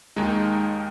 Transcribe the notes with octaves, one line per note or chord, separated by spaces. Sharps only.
D#2 D#3 G#3 D#4